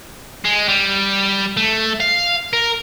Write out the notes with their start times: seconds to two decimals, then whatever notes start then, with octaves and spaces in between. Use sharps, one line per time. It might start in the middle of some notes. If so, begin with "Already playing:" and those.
0.45 G#3
0.68 G3
1.57 A3
2.00 F5
2.53 A#4